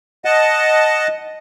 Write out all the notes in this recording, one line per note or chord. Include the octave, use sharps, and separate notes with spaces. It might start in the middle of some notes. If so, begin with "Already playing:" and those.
D#5 F#5 A5